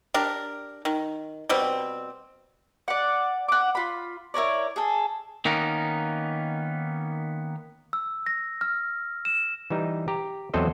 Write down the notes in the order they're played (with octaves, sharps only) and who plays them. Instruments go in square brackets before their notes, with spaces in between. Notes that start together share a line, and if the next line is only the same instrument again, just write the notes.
[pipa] D4 G4 A#4
D#3
B2 G3 C4
[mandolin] D5 F#5
F#5 D6
F4 B5
E4 A#4 C#5 D5
G#4 A4
[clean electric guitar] D#3 A#3 B3 C#4 D#4 A#4
[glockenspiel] E6
A#6
F6
E7
[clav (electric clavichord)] E3 G3 D#4
G4 A#5
E2 F#3 C4 A4 C5 D#5